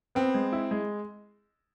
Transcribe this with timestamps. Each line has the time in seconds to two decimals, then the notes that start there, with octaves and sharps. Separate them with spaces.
0.15 B3 C4
0.35 G#3
0.53 E4
0.71 G#3